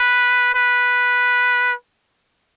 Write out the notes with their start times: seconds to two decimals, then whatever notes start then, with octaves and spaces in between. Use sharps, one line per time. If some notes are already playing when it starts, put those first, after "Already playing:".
Already playing: B4
0.55 B4